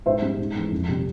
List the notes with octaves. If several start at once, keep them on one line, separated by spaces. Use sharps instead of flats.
G#2 C5 E5
G3
G#2
E3 G#3
F2
C3 G3